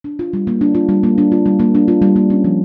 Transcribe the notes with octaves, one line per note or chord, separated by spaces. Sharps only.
D4
F4
G3
A#3
D4
F4
G3
A#3
D4
F4
G3
A#3
D4
F4
G3
A#3
C#4
F3